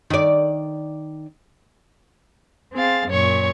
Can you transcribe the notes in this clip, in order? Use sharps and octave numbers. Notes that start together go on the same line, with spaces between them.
D#3 D5
C4 G#4 F5 A6
F#2 A#2 C#5 C#6